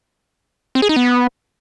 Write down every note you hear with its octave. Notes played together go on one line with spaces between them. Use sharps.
C4
G#4
D#4
B3